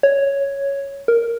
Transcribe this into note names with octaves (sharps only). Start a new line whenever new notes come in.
C#5
A#4